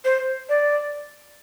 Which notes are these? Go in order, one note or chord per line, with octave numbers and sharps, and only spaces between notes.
C5
D5